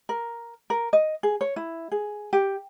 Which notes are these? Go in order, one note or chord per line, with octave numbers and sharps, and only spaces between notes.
A#4
A#4
D#5
G#4
C#5
E4
G#4
G4